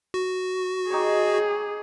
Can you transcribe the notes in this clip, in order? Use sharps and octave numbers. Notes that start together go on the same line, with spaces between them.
F#4
D#4 G4 G#4 C#5